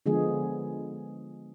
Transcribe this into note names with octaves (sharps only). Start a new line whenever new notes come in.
D3 F3 G#3 B3 G#4